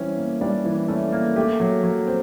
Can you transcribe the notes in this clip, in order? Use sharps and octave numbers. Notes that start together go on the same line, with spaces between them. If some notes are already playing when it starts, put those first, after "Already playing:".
Already playing: E3 G3 C4 C#4
A#3
G3 D4 D5
E3
A3 C#4 A4
A#3
A3 G4
F#3
F#3
C4